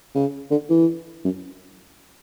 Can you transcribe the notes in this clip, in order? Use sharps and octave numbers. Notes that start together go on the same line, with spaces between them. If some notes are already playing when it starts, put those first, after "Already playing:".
C#3
D3
E3
F#2